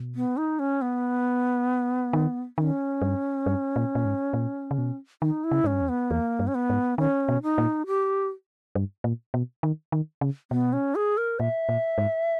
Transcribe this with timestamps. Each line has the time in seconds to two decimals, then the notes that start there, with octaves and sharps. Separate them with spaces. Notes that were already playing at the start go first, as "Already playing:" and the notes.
Already playing: B2
0.15 B3
0.37 D#4
0.59 C#4
0.82 B3
2.13 D#3
2.58 D#3 C#4
3.02 G2
3.46 G2
3.76 A#2
3.95 A#2
4.05 G#2
4.34 A#2
4.71 C#3
4.78 B2
5.22 D#3 D#4
5.44 E4
5.51 C#3
5.64 G#2 C#4
5.72 G2
5.81 E2
5.89 B3
6.11 E2 A#3
6.39 G2
6.47 C#4
6.55 B3
6.70 G#2
6.98 D#3 C#4
7.29 B2
7.43 D#4
7.58 A#2
7.87 G4
8.75 G2
9.04 A#2
9.34 B2
9.63 D#3
9.92 D#3
10.21 C#3
10.51 B2 B3
10.73 C#4
10.95 G#4
11.17 A#4
11.39 A#2 E5
11.69 A#2
11.98 G#2